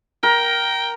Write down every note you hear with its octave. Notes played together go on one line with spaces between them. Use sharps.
A#4 G5